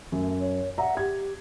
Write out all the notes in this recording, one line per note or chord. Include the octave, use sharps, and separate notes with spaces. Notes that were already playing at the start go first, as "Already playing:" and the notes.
F#2 A3
C#5
D5 E5 F#5 A#5
G4 G#6